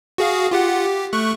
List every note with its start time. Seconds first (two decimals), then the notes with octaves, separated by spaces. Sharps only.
0.18 F#4 G#4 F5
0.51 F4 G4 F#5
0.85 G4
1.13 A3 C#6 F#6